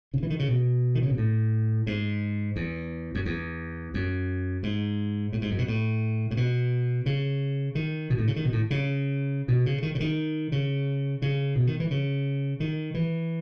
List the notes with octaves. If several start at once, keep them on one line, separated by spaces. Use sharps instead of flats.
C#3
E3
D#3
C#3
B2
D#3
C#3
B2
A2
G#2
E2
F#2
E2
F#2
G#2
A2
G#2
F#2
B2
A2
A2
B2
C#3
D#3
B2
A2
C#3
D#3
B2
A2
C#3
B2
C#3
D#3
C#3
D#3
C#3
C#3
B2
D#3
E3
C#3
D#3
E3